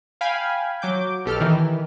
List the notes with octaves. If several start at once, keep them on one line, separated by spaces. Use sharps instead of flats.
F5 G5 G#5 B5
F#3 D6 G6
B1 G4 A4 F6
D#3 E3